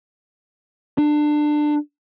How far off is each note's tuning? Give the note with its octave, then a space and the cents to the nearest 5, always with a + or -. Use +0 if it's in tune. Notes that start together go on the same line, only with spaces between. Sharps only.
D4 +25